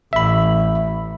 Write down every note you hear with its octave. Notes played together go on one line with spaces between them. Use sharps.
A1 E5 B5